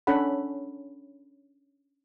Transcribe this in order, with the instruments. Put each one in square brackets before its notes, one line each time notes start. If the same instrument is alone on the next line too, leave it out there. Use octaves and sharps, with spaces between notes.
[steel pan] C#4 D4 A4 C#5 F#5 B5